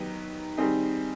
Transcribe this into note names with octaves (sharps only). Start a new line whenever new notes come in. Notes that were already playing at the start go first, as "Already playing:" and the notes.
Already playing: D#3 F#3 B3 D#4 G4
D#3 G3 C4 D#4 G#4